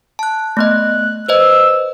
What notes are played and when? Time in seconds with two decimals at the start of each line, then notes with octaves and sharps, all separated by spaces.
0.19 A5 F#6
0.57 A3 B3 D#5 F#6
1.28 B4 C5 D#5 E6